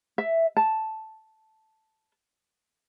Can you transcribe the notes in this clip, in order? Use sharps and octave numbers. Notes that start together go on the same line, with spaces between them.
E5
A5